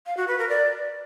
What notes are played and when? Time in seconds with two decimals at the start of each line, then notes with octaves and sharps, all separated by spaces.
0.06 F5
0.17 F#4
0.28 B4
0.39 A#4
0.49 D5